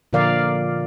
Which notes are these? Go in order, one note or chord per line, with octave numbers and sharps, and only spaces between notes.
A#2 D3 F3 A#4 D5 F5